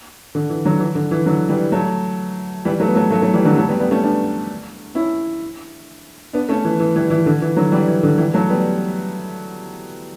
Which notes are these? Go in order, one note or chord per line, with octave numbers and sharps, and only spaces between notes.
D3
E3
D3 F#3
E3
D3
E3
D3 F#3
E3 G3
F#3 A3
E3 G3
F#3 A3
B3
F#3 A3
F#3 A3
F#3 A3
E3 G3
D3 F#3
F#3 A3
G3 B3
G3 B3
A3 C#4
B3 D4
C#4 E4
B3 D4
A3 C#4
E3
E3
E3 G3
E3
D3
E3
D3 F#3
E3 G3
E3
D3
E3 G3
F#3 A3
G3 B3